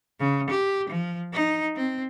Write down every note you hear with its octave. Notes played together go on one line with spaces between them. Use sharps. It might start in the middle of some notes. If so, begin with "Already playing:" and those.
C#3
G4
F3
D#4
C4